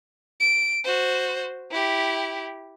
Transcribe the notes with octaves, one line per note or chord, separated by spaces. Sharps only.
D7
F#4 C5
E4 G4